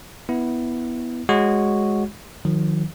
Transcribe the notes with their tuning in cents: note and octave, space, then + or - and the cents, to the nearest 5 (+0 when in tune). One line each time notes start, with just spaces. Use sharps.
B3 +0 E4 -10
G#3 +0 F#4 +0 C#5 +0
D#3 +0 F#3 -45